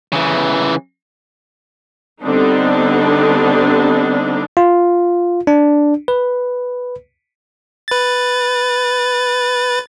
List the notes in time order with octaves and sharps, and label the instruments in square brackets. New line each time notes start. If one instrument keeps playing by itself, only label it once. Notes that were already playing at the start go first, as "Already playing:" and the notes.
[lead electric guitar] C#3 E3
[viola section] D3 G3 B3 C4 D4 D#4
[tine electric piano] F4
D4
B4
[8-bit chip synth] B4 A6